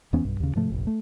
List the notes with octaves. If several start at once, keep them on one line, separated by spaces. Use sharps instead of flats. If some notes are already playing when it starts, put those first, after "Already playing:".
E2 E3 B3 C#4
B1 G2
D#2 C#3
G#2 C3 F3 A3
F1 A#1
A3